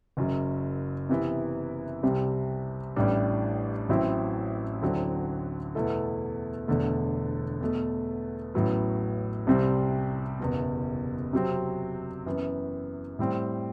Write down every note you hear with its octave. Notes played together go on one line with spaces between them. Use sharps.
F#1 F#2 F#3
C3 E3 B3 E4
C2 C3 G3
A1 A2 G3 D4
A1 A2 F#3 C4 E4
D2 D3 F#3 C4 E4
E2 B2 A3 E4 A4
E1 E2 D3 A3
E2 B2 A3
A1 A2 F#3 B3
C2 C3 G3 C4
F#1 E2 B2
C3 F#3 C4
F#2 E3 B3
A2 G3 C4